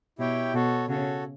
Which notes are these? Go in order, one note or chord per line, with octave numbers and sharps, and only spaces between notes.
B2 E4 G4 C#5 G5
B2 F#4 A4 C#5
C#3 F#4 A4 C#5